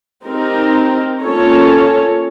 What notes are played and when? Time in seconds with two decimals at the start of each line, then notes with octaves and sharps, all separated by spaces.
0.24 C4 D#4 G4 A#4
1.21 A#3 C#4 F4 A4 C#5